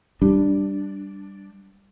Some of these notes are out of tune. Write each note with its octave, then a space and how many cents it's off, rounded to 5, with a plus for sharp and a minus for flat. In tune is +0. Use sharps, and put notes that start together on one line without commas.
G3 +0 D4 +0